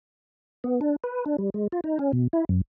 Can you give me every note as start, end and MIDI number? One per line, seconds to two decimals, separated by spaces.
0.64 0.80 59
0.81 0.96 62
1.04 1.24 71
1.26 1.36 62
1.38 1.50 55
1.54 1.67 56
1.72 1.80 65
1.84 1.98 63
1.99 2.12 61
2.13 2.28 47
2.33 2.45 64
2.49 2.61 42